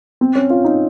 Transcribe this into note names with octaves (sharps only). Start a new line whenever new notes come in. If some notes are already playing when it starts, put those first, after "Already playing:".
C4
C#4
F4
D#4